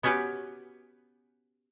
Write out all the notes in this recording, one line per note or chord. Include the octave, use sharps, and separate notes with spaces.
B3 C#4 F#4 G4 B4